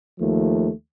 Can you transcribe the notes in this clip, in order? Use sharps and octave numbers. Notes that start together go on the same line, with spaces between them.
D#2 F3 A3